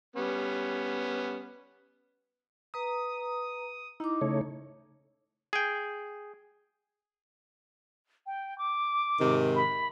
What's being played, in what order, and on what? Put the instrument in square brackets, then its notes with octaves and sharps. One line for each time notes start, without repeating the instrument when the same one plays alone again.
[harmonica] G3 B3 C#4
[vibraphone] B4 A#5 [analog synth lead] D#6
[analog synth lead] D#4 [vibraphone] E4 D6
[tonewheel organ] C#3 A3 C#5
[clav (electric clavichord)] G#4 G5
[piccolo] G5
D6
[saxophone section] G#2 C3 D#3
[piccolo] B5